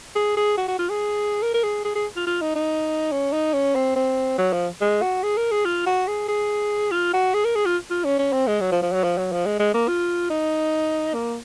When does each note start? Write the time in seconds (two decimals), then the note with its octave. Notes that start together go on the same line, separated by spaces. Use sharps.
0.16 G#4
0.37 G#4
0.58 F#4
0.68 F#4
0.79 F4
0.90 G#4
1.42 A#4
1.54 A#4
1.63 G#4
1.85 G#4
1.95 G#4
2.16 F4
2.27 F4
2.41 D#4
2.55 D#4
3.12 C#4
3.33 D#4
3.54 C#4
3.75 C4
3.96 C4
4.38 F#3
4.53 F3
4.81 G#3
5.02 F#4
5.23 G#4
5.37 A#4
5.51 G#4
5.65 F4
5.86 F#4
6.07 G#4
6.28 G#4
6.91 F4
7.13 F#4
7.34 G#4
7.45 A#4
7.56 G#4
7.66 F4
7.90 F4
8.05 C#4
8.19 C#4
8.33 C4
8.47 G#3
8.61 F#3
8.72 F3
8.82 F3
8.93 F#3
9.04 F3
9.18 F#3
9.32 F3
9.46 G#3
9.60 G#3
9.74 A#3
9.88 F4
10.30 D#4
11.14 A#3